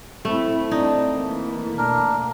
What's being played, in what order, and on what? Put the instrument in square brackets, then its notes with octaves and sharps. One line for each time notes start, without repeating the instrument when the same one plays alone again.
[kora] A3 [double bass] C4 E4
[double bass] C4 [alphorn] D4 [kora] D#4
[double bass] E3 A3 [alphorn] A#3
[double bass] B2 [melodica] D4 A#4